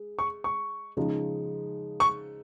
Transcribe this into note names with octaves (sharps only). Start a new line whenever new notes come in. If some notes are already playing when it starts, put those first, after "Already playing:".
Already playing: G#3
C#6
C#6
C#3 F3 G#3 D#4
C#6